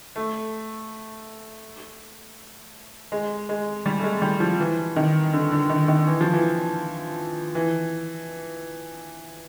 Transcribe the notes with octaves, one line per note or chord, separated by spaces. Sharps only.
A3
G#3
G#3
G3
A3
G#3
G3
F3
E3
D#3
D3
D3
D#3
D#3
E3
F3
E3
E3